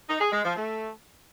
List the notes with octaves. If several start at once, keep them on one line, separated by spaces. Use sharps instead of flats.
D#4
G#4
G#3
F3
A3